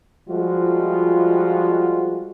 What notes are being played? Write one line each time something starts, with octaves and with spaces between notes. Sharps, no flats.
F3 G3 G#3 F4 F#4